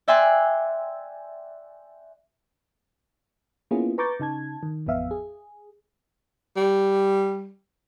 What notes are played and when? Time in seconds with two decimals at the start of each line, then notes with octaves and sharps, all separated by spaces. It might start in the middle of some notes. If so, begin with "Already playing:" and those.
0.08 D5 E5 G5 G#5 C6 F#6
3.71 A#3 B3 C#4 E4 F4 G#4
3.98 B4 A#5 C#6 D6 G6 A6
4.20 C#3 D#4 A5 G#6
4.63 D#3
4.87 A1 F2 B3 E5 F5
5.11 G#4
6.57 G3